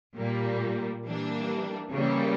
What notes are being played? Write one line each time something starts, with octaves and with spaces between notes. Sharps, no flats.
A#2 G3 A#3
E3 G3 A#3 D4
C#3 E3 G3 A#3